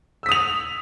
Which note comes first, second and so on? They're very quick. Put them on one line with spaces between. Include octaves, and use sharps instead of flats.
E6 B6 D#6 F7